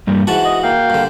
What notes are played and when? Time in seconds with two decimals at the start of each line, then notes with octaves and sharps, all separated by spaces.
0.07 G2 G3 A#3
0.27 G#2 E3 F#4 F#5 A5
0.45 D#5
0.63 A#3 F5 G5
0.90 G2 D3